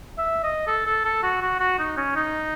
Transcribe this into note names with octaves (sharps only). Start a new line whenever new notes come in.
E5
D#5
A4
A4
A4
F#4
F#4
F#4
D#4
C#4
D#4